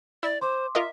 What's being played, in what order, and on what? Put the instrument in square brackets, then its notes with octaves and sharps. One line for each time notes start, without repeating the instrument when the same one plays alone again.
[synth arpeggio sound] E4 [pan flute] D5
[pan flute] C5 [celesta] C6 D6
[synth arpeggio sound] F4 A#4 D#5 [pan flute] E5